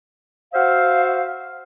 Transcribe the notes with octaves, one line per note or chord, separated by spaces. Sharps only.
F#4 C5 E5 F5